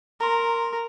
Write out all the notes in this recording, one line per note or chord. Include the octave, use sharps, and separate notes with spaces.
A#4 A#5 C6